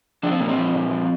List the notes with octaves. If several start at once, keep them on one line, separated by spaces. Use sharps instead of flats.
F3 D4
C4
A#2 A#3
C4
F3
A#2
F3